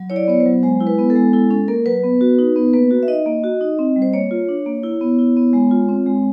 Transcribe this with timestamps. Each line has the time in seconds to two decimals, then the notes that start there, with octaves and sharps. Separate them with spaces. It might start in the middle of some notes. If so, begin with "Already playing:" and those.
Already playing: F#3
0.10 E4 C#5
0.16 D5
0.28 B3 C#5
0.40 C5
0.46 F#3
0.63 G#3 C5
0.80 E4
0.87 B4
0.98 B3
1.10 A4
1.16 G#3
1.33 E4 A4
1.50 C#4 A4
1.68 A#3 A#4
1.86 F#3 B4
2.03 B3
2.21 F#4
2.39 D#4
2.56 B3
2.73 A#3 B4
2.91 F#4
3.03 E5
3.08 D#4 D#5
3.26 A#3
3.44 F#4
3.61 D#4
3.79 C4
3.96 G3
4.02 C5
4.13 A#3 C#5
4.31 F4
4.49 D4
4.66 A#3
4.83 E4
5.01 B3
5.19 E4
5.36 B3
5.53 G#3
5.71 F4
5.89 C4
6.06 G#3